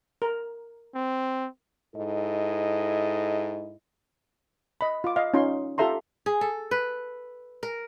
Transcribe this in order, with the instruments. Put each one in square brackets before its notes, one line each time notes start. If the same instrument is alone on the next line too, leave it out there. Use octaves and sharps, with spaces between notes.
[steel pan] A#4
[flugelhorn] C4
[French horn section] G#2 E4 A4 D#5
[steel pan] D#5 B5
F4 D6
D#5 F5
C#4 D#4 F4 C6
F4 G4 A4 E5 A#5 C6
[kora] G#4
A4
B4
A#4